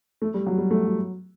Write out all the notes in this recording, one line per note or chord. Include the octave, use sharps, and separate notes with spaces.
A3
G3
F#3
G3
A3
F#3